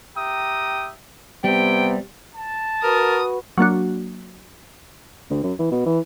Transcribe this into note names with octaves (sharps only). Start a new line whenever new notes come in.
G4 E5 G5 A#5 D#6
C3 G3 B3 G5
A5
F#4 A#4 B4 D#6
F#3 A#3 D4 F#4
D2
F#2
E3
B2
E3